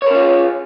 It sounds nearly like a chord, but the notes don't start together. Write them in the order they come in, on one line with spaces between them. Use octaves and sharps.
C#5 A#4 C#4 F4 G#4